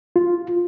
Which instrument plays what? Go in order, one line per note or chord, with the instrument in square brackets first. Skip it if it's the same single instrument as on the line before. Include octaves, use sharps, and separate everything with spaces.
[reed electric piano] F4